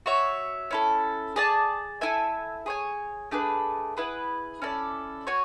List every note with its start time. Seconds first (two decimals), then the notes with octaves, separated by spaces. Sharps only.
0.06 F#4 C#5 E5
0.71 C#4 E4 A4
1.36 G#4 D5 A5
2.01 E4 A4 E5 G#5
2.66 G#4 C#5 G#5
3.31 A3 D4 G#4 B4
3.97 E4 G#4 B4 F#5
4.62 C#4 E4 A4 D5
5.27 F#4 C#5 G#5